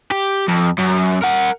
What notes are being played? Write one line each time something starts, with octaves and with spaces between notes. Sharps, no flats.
G4
F2
F#2
A#4 F#5